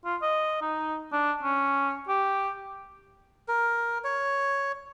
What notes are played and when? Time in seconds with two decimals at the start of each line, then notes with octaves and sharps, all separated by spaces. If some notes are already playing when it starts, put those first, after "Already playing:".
0.05 F4
0.22 D#5
0.61 D#4
1.12 D4
1.42 C#4
2.08 G4
3.48 A#4
4.04 C#5